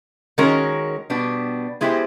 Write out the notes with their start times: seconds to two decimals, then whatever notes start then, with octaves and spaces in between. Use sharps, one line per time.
0.38 D#3 G#3 C#4 F#4 A#4
1.10 B2 G3 B3 D4
1.81 G#3 B3 E4 G4 C5